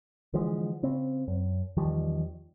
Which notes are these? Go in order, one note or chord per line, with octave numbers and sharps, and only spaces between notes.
D3 E3 F3 G#3
C#3 C4
F#2
E2 D#3 F3 G3